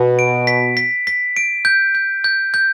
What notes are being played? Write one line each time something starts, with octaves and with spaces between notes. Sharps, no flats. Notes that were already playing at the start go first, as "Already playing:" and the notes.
Already playing: B2
D7
B6
B6
B6
D7
G6
G6
G6
G6